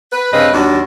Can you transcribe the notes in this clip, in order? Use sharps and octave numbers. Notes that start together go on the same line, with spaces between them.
B4
G2 C#3 C4 B4 D#5
D#2 F#3 G3 D4